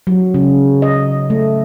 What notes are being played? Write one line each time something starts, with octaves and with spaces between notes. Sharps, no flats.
F#3
C#3
D#5
A3